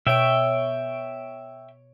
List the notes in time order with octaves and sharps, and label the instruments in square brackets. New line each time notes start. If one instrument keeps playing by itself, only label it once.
[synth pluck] B2 C#5 D7 [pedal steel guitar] E5 G5